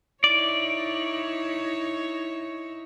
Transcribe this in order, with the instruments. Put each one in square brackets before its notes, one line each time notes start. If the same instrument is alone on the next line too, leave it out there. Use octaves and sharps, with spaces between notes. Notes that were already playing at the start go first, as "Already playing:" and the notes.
[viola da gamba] D#4 E4 C#5 [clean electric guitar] D5